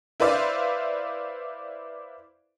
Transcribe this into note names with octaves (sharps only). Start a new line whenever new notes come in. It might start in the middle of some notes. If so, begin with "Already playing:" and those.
E4 B4 C5 D5 E5 F5